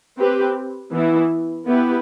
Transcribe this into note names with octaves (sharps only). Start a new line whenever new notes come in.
C4 G4 B4
E3 B3 E4
B3 E4 G4 B4